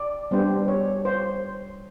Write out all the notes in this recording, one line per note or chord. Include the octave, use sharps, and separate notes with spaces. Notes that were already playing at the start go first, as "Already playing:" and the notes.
Already playing: D5
G3 B3 D4 G4 C5
C#5
C5